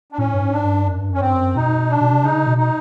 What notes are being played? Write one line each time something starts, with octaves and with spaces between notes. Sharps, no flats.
D4
A2 C#4
G2
G#2
D4
G2
F#2
G2
F#2 C#4
G2 C4
F#2
B2 D#4
D4
B2
C3
C#3 D#4
B2
D#4